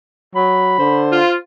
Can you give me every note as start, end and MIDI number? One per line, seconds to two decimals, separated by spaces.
0.36 0.77 54
0.36 1.01 83
0.79 1.20 50
0.79 1.36 72
1.12 1.36 65